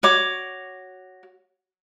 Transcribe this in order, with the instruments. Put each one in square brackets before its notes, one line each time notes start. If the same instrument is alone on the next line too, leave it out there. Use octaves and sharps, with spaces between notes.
[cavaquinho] F#4 C#5 D6